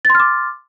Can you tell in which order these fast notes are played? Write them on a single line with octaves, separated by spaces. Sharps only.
A6 C6 F6 D6